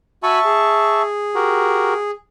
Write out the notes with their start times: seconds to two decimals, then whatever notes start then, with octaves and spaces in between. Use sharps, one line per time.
0.23 F#4 E5 G#5 A5 B5 C#6
0.45 G#4
1.35 F#4 G4 A#4